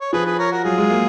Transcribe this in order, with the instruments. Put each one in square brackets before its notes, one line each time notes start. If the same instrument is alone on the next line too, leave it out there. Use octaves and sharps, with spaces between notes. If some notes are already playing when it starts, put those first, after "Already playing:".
[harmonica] C#5
[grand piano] F3 [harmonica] G#4 B4
[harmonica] G#4 B4
A#4 C#5
F#4 A#4
[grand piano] F#3 [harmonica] F4 G#4
[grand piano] G#3
A#3